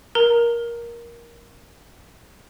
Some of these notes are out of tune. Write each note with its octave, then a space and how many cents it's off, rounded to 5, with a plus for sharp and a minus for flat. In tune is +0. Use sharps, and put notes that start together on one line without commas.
A#4 +15 A#5 -15